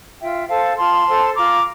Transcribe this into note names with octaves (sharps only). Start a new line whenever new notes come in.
F4 E5 G5
A4 C5 F5 A5
F4 A5 C6
A4 C5
F4 A#5 D6